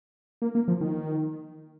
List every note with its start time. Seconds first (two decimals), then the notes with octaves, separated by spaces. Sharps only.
0.42 A#3
0.55 A#3
0.68 F3
0.81 D#3